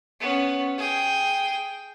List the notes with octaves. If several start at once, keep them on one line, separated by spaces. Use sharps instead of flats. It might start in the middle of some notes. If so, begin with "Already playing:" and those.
B3 C#4
G#4 G5